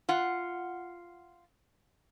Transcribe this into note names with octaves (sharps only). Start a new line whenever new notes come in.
F4 F#5